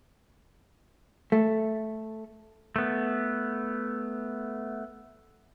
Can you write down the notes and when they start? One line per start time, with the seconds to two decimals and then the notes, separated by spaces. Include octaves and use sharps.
1.32 A3
2.76 A3 B3